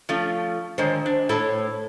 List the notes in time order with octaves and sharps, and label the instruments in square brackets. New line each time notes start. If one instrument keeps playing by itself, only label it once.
[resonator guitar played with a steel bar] F3 A3 C#4
[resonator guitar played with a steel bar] D3 D#3 G#3 [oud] C5
[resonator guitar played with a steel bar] D4
[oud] A2 [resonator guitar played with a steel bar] E4 A4 A5